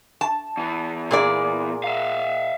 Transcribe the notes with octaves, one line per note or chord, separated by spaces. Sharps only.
A5
E2 E3
A#2 G#4 D5
E5 F5